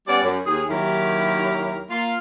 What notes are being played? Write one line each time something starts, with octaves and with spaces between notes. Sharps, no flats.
G3 B3 C#4 D5
F#2
D#2 G#4
D#2 D#3 F#3 E4 G4 A#4
A#3 F4